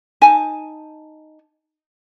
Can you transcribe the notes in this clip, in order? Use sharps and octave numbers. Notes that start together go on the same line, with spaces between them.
D#4 G#5 A5